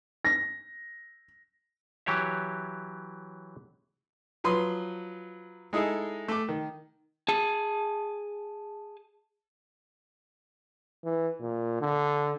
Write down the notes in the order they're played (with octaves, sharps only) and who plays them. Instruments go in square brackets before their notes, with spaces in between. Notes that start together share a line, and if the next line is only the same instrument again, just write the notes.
[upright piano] A#6
[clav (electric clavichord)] E3 F#3 G4 C#5 E5
[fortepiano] F3 F#3 B4 C6 D#6
G#3 D#4 E4 G#4 A4
A3 D6
D#3
[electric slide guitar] G#4 A5
[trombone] E3
A#2
D3